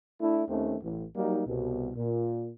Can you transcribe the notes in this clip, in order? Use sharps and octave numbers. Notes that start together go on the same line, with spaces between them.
A3 D4 E4
D#2 D#3 A3 C4 C#4
A1
F#3 G3 A#3 D#4
C2 B2
A#2